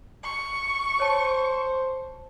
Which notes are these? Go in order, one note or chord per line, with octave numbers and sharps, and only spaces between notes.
C#6
C5 C#5 A5